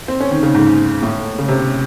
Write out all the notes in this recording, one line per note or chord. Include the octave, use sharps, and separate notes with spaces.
C4
C#4
D#3
C#3
G#2
A2
C#3
C3